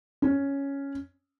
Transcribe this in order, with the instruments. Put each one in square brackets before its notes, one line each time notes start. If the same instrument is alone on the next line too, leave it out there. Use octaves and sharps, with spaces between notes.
[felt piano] C#4